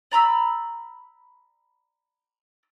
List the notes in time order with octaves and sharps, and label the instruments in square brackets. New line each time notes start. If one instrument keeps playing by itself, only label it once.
[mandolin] D5 A#5 B5 E6